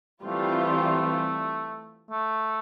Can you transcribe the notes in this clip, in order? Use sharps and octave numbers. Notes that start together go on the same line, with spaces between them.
E3 G3 A3 C4 F4
A3